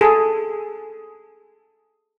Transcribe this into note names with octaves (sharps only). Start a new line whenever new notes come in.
G#4 A4